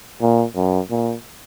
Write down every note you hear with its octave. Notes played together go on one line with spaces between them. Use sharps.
A#2
F#2
A#2